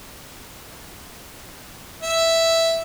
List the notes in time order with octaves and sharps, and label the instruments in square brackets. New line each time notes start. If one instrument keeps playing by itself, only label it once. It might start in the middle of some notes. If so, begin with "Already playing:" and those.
[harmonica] E5